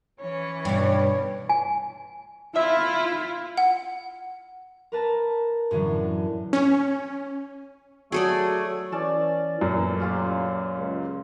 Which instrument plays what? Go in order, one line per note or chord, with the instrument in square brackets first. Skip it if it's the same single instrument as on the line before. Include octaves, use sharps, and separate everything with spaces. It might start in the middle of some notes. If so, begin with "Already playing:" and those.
[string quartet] E3 C#4 C#5
[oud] G2 B2
[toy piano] G#5
[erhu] E4 [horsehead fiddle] F4 [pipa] E5
[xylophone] F#5
[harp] A#4 B4 A5 A#5
F#2 A2 D3 E3 F#3
[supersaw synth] C#4
[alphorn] F#3 [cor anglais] A3 [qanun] G#4 A4 D5
[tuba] E3 [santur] C#4 D5 A5
[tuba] A1 [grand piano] F#2 A#2
[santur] C#4 F4 G4
[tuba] C#2